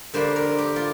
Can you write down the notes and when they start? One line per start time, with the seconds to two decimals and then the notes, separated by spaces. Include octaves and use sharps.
0.14 D3 G3 A#3 C5
0.36 A#4
0.58 G4
0.76 F4